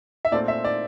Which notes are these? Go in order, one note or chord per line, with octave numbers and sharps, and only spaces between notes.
E5
A#2 A3 C4 D5
E5
D5